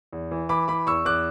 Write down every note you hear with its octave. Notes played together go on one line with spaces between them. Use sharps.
E2
E3
E3 B5 D6
E3 B5 D6
E2 C#6 E6
E2 D6 F#6